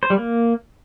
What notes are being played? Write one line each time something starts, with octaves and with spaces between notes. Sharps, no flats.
C5
G3
A#3